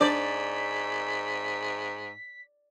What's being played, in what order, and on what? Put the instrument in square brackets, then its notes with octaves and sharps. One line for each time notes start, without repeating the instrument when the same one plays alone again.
[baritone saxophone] G#2 [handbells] D4 C5 [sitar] D5 [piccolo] B6